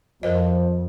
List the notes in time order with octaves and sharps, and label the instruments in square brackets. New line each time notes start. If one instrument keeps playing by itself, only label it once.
[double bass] F2 [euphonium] F3 [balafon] A#4 C5 D#5